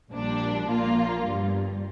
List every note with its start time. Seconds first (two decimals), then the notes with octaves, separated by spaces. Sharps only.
0.09 A#1 A#2 G3 D4
0.66 A#1 A#2 A#3 F4
1.23 G1 G2 G3